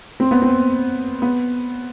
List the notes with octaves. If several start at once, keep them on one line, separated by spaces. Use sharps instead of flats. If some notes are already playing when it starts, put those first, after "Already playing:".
C4
B3
C4
B3